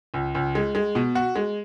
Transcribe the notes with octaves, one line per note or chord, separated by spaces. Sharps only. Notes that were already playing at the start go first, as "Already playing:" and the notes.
C#2
C#2
G#3
G#3
B2
F#4
G#3